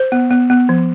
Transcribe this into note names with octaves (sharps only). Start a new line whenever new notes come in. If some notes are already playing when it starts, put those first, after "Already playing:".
Already playing: C5
B3
B3
B3
F3